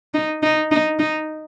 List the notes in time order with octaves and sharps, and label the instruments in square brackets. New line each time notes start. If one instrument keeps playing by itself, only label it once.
[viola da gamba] D#4
D#4
D#4
D#4